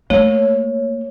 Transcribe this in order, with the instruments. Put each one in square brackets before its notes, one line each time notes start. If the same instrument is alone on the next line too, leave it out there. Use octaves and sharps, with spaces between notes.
[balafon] A3 [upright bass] A#3 [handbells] C#5